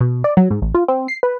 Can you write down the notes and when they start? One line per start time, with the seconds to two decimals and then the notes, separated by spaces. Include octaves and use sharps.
0.01 B2
0.24 D5
0.37 F#3
0.50 G#2
0.62 A1
0.74 F4
0.88 C4
1.08 C7
1.23 B4